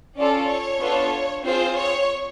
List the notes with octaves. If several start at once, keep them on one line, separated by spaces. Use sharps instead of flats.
C#4 F4 A4 D5
C#5
B3 D4 F4 A4
C4 F4 G#4 C5
C#5